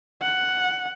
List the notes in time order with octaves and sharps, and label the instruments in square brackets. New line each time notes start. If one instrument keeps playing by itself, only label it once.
[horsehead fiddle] F#5